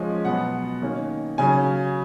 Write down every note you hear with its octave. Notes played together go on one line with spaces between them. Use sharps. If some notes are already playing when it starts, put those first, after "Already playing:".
Already playing: F3 G#3 C#4 G#5
B2 F#3 B3 F#5
D#3 A#3 C#4
C#3 F#3 C#4 G#5